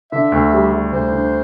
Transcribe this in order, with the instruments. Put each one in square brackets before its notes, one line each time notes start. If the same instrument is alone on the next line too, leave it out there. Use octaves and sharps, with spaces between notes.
[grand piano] D3 [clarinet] E5
[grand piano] D2
G3
G3
[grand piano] D2 [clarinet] C5
[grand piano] D3